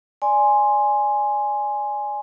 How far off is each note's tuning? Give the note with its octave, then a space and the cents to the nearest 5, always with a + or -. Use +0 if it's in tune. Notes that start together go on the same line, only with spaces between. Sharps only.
D5 +0 G#5 +0 C6 +5